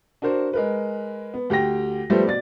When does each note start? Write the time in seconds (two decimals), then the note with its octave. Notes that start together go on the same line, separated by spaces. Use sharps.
0.22 D4 F#4 A#4 C5
0.53 G#3 A#4 B4
1.34 B3
1.50 D2 G4 G5 A#6
2.10 F3 G3 A3 B3 G4 C5
2.26 B2 D5 A6